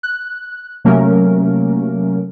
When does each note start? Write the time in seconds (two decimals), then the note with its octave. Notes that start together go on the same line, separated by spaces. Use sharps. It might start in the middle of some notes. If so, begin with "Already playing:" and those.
0.03 F#6
0.85 C3 F#3 A3 A#3 C#4 A#4